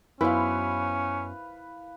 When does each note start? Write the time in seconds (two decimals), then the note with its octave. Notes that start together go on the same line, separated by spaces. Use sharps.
0.21 F#2 B3 C#4 E4 F#4 B4 C5 F5